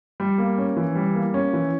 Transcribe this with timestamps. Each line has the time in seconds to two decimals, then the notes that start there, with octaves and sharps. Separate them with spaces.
0.20 G3
0.38 A#3
0.58 C#4
0.77 E3
0.95 G3
1.14 A#3
1.34 C#4
1.53 E3